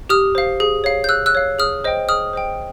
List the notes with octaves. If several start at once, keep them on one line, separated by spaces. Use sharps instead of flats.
G4 D#6 F6
C5 F5
G#4
C#5 F5
G6
G#4 E6 F#6
E6 F#6
C#5 F5
G#4 D#6 F6
C5 D#5 G5
G#4 D#6 F6
C5 D#5 G5